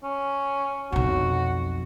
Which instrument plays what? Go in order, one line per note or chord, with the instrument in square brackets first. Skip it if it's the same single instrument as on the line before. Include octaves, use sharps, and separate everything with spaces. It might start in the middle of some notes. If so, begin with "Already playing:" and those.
[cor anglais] C#4
[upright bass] B1 F2 [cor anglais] F#4